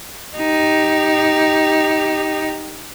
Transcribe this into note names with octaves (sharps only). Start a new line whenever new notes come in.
D#4 G4